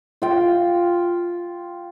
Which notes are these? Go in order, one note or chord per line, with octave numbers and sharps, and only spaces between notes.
F4 G5